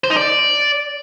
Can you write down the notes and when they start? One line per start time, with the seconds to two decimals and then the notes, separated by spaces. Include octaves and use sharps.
0.04 C5
0.10 D#4
0.17 D5